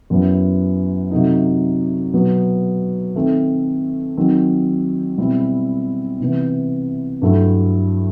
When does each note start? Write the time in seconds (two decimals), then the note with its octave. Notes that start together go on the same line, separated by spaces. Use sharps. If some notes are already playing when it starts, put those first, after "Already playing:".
0.10 F#2 F#3 B3 E4
1.11 C3 F#3 A3 D#4
2.13 B2 F#3 B3
3.15 D#3 A3 C4
4.17 D#3 F#3 C4
5.18 B2 G3 C4 E4
6.20 C3 E3 B3
7.22 G2 F#3 A3 E4